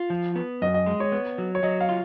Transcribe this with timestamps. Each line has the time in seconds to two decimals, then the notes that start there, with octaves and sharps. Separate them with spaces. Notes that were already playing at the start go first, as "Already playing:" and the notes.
Already playing: F4
0.10 F3
0.36 B3
0.62 F#2 D#5
0.74 D#5
0.86 G#3
1.00 C#5
1.12 B3
1.38 F#3
1.55 C#5
1.63 F#3 D#5
1.80 F5
1.89 F4